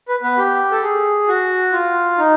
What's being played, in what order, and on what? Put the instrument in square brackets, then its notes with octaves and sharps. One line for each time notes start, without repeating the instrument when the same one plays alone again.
[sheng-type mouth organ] B4
B3 B4
G4
A4
G#4
F#4
F4
D#4